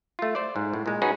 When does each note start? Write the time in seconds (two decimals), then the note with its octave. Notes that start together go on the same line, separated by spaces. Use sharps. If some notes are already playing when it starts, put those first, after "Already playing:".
0.19 A3 F4
0.35 C5 D5
0.56 G#2
0.74 A2
0.86 A#2 G#3
1.02 C#4 D#4 F#4 G#4 B4